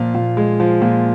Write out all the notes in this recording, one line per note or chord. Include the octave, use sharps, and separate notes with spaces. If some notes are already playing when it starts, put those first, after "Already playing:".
Already playing: A#2 F3 F5
A#2
G#3
F3
A#2